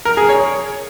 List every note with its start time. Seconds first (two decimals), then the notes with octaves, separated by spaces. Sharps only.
0.05 A#4
0.17 G#4
0.29 C#5